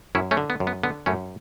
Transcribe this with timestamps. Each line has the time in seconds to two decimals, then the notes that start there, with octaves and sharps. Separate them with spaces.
0.15 F#2 C#4 E4
0.31 A3 C#4
0.37 D3
0.50 B3
0.60 F#2
0.67 B3
0.83 D3 B3
1.06 F#2 A3 C#4